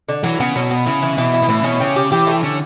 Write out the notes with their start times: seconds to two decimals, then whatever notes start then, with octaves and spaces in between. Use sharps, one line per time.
0.09 D3
0.23 E3 F#3
0.40 C#3 B3
0.55 B2 F#3
0.71 B3
0.86 C#3 E4
1.03 E3
1.17 B2 E3
1.34 E4
1.42 B2
1.48 A2 E3
1.59 C#3
1.64 B2 C#4
1.80 C#3 G4
1.96 G4
2.12 E3 G4
2.27 A3
2.42 D3 C#4